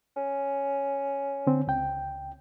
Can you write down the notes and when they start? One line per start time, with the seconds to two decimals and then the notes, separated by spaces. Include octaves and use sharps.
0.16 C#4
1.47 D3 C4
1.67 C#2 G5